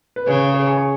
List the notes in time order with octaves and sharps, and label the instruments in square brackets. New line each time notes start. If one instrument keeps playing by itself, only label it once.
[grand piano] B4
[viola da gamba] C#3 [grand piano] G#4 C#5
[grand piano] G#4 C#5
G#5 C#6
G#5 C#6